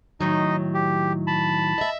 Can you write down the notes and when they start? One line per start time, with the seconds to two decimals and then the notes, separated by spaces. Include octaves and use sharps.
0.21 A2 D#3 F#3 D#4 D#5
0.74 G4
1.27 A5 B5
1.78 D#5 E5